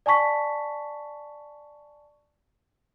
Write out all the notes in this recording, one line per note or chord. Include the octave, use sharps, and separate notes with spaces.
D5 G#5 A5 C#6 B6